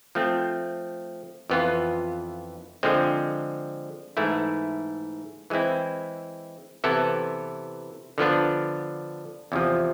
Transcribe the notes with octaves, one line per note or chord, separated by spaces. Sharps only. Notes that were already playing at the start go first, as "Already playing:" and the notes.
F3 A3 C4
F2 E3 B3 F4
D3 F3 G#3 C4
G#2 E3 A3 E4
E3 G#3 C4 E4
C3 E3 B3 E4 A4
D3 F3 B3 D4
E2 C3 F3